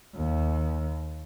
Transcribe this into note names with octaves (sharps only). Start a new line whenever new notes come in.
D#2